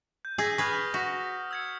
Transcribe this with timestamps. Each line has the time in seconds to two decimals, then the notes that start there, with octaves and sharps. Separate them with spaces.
0.25 G6
0.38 G#4 E6 A#6 B6
0.58 G#4 B4 C#6 D#6 F6
0.94 F#4 A#6 B6
1.51 E6 G#6 C#7